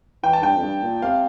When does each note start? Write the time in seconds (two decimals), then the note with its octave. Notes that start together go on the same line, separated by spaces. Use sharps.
0.23 E3 G5
0.33 A5
0.42 G2 G5
0.56 F2
0.62 G2
0.83 A#2
1.02 C3 F5